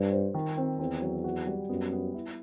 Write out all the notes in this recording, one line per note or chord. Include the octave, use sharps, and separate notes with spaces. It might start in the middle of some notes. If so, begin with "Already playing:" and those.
Already playing: G2 G3 C5
C5
D#3
C4
E2 C4
F#3
F#4
G3
F#2 B3
B3
E4